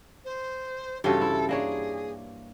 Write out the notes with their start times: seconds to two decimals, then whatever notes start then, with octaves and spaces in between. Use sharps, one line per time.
0.24 C5
1.04 G2 C#3 E3 C4 F#4 G4 A4
1.21 E4
1.49 A#3 D4 G#4 C#5